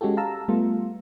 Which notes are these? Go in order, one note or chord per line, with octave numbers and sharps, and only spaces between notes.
G#3 C#4 F#4 G4 A4
F5 A5 A#5 E6
G3 A3 B3 F4